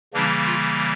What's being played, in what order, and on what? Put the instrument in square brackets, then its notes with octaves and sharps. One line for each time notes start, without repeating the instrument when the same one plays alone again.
[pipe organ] C#3 E3 G3 A#3 D4
F4